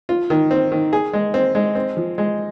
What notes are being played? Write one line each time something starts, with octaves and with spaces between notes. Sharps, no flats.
F4
D#3
C4
D#3
G#4
G#3
C4
G#3
C4
F3
G#3